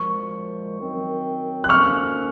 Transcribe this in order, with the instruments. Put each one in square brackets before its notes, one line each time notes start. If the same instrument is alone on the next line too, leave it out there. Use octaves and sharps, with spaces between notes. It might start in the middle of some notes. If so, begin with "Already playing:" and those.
Already playing: [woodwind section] A#2 F3 G#3 [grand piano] C#6
[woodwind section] F#2 D#3 F#3 C4
[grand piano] F#6
[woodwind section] F2 D#3 A#3 C#4 [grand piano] C#6 F6